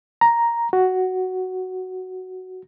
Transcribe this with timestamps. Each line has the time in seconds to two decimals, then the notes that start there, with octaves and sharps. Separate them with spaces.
0.21 A#5
0.73 F#4